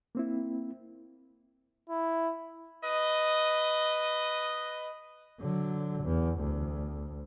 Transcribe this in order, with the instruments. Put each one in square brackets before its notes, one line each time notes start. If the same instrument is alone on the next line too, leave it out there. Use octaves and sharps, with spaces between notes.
[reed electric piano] A#3 C4 E4
[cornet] E4
[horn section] B4 D#5
[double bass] D3 F#3
E2
D2